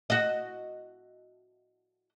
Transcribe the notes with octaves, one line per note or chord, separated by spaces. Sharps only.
F#4 D#5